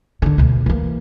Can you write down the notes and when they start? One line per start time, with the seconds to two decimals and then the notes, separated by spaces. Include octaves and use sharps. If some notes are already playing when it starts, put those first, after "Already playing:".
0.22 D3 D#3
0.38 D2 B2
0.66 E3 A#3